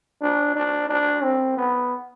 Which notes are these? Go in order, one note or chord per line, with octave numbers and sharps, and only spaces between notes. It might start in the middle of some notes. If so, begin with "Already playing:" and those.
D4
D4
D4
C4
B3